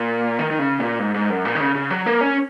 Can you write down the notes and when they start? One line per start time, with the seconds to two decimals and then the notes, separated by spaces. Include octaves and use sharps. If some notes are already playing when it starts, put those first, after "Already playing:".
Already playing: A#2
0.39 D#3
0.51 D#3
0.59 C#3
0.79 A#2
0.99 G#2
1.15 G#2
1.30 F#2
1.45 A#2
1.55 D#3
1.60 C#3
1.75 C#3
1.90 F#3
2.06 A#3
2.21 C#4